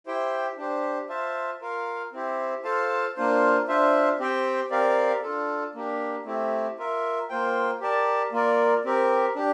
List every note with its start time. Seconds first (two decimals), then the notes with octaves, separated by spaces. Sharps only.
0.06 E4 G4 C5 G5
0.57 D4 G4 C5
1.09 F4 C5 E5 A5
1.62 F4 A#4 F5
2.12 C4 E4 G4 C5
2.64 F4 A4 C5 F5 A5
3.16 A#3 D4 F4 C5
3.68 D4 F4 C5 E5
4.19 C4 G4 C5 G5
4.70 C4 G4 A#4 D5 F5
5.22 D4 F4 A4
5.75 A#3 D4 G4
6.25 A3 C4 E4 G4
6.78 F4 A#4 E5
7.30 A#3 F4 C5 G5
7.81 G4 A#4 D5 A5
8.32 A#3 F4 A#4 D5
8.85 C4 G4 A#4
9.35 D4 G4